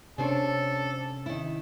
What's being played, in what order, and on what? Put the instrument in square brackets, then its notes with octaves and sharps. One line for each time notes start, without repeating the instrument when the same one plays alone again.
[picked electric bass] C3 C#4 [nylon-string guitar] D4 C5 C#5 [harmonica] A4
[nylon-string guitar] D#3 E4